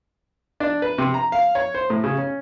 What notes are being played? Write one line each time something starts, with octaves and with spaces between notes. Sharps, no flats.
D4
B4
C3
A#5
F5
C#5
C5
A2
C#3
C#4